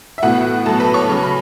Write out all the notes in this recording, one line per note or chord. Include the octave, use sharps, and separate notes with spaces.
E5
A2 E3 B3 F#4 F#5
A2 F#3 B3 A4 A5
B4 B5
C#5 C#6
C#3 F#3 C#4
B5